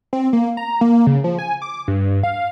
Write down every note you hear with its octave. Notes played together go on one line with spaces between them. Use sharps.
C4
A#3
A#5
A#3
C#3
F3
G#5
D6
G2
F5